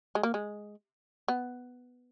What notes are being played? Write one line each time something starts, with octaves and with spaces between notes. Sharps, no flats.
G#3
A#3
G#3
B3